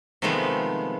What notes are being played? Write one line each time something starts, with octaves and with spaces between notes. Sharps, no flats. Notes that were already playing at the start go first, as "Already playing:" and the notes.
C3 D#3 F3 G#3 A3 B3